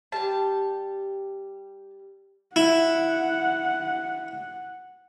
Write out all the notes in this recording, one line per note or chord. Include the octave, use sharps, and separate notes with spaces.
G3 G4 A5
E4 F#5